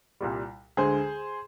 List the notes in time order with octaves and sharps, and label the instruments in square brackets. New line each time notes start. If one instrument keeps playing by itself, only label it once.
[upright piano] C2 A#2 G3
D2 D3 G#3 G#4 C5